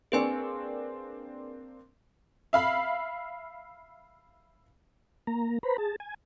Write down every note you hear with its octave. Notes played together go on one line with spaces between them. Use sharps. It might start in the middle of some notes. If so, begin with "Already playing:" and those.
A#3 C4 D4 G#4 B4 G#5
E5 F5 B5
A#3 A#5
B4 C5 A#5 B5
G#4 A5
G#5